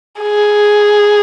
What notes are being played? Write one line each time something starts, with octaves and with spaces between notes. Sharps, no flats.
G#4